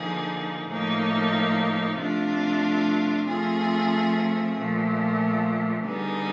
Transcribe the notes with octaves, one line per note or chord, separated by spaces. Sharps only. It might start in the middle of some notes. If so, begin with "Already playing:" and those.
Already playing: D3 F3 A#3 D#4 G#4
A2 F3 A#3 D#4
C3 F3 A3 D4 F4
F3 A3 C4 F4 G#4
A#2 F3 A3
D3 G3 B3 D#4 G#4